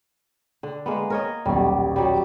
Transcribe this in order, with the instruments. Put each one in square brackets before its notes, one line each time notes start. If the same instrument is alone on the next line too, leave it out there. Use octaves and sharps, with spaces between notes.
[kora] D3
G#3 A#3 B3
A#4 C#5 D#5
[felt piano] D#1 B1 [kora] G3
[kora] F#3 G3